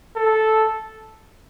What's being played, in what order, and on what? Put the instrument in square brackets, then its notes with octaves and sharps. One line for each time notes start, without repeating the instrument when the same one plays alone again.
[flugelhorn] A4